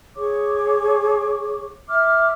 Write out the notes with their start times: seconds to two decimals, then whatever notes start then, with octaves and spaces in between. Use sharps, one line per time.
0.15 G#4 C#5 C#6 D6
1.88 E5 D6 F6